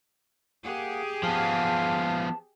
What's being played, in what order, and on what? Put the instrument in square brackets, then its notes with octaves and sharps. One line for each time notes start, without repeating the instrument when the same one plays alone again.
[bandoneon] A#3 F#5 [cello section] G4 G#4
[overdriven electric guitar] F3 B3 [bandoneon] F5 [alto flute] A5